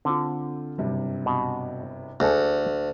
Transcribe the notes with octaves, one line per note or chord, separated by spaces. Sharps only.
D3 C4 F4
F#1 G2 C3
B2
D2 G#4 A4